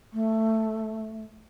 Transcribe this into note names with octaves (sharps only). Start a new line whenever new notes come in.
A3